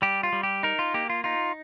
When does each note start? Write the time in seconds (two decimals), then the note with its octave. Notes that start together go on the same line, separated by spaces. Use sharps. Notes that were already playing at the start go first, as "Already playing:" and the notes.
0.02 G3 G4
0.23 F4
0.33 G3
0.43 G4
0.63 D#4 A#4
0.79 F4
0.94 A#3 G4
1.10 F4
1.24 D#4 F4